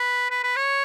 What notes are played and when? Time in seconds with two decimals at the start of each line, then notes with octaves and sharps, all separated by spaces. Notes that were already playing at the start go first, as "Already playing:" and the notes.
Already playing: B4
0.31 B4
0.43 B4
0.56 C#5